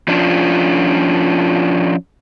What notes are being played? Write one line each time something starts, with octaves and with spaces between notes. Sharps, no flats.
F3 C#4 D4 F4